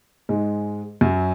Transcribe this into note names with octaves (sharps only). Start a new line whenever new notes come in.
G#2 G#3
F#2 F#3